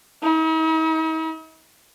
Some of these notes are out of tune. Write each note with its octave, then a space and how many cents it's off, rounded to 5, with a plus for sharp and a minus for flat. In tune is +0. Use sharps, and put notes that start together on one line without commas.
D#4 +45